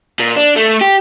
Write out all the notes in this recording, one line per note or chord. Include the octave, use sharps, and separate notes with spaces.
A#2
D4
A3
G4